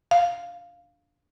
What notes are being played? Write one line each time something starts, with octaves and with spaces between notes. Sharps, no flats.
F5